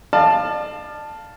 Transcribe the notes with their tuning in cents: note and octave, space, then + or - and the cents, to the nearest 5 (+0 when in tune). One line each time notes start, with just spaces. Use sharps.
D5 +40 F5 +0 A5 +0